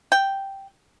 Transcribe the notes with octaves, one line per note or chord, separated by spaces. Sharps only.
G5